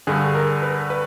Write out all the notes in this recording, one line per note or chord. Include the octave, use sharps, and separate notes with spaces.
G2 D3 G#4
A#4
B4
B4